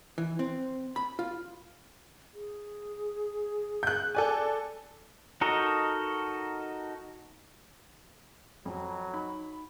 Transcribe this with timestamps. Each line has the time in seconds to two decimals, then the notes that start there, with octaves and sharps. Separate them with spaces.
0.18 E3
0.39 C4
0.96 B5
1.19 F4
2.34 G#4
3.83 F#6 G6
4.15 A4 D5 G#5
5.41 D#4 F#4 A4 A#4 D#5
8.65 F2 F#3
9.14 D#4 B5